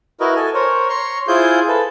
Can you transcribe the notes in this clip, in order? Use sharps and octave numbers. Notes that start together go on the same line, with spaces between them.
E4 F#4 A#4 B4 D#5
A4 G#5
A#4 C5 C#5
C#5 A#5 C6 C#6
E4 F4 G#4 C5 G#5 G6
A4 B4